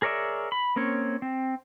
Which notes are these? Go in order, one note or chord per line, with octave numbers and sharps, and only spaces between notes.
G#4 A#4 C#5 D5 E5
B5
A#3 C4 C#4 C#5
C4